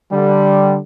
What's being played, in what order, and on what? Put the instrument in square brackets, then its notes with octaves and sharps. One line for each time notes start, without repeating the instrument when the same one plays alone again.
[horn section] D3 G3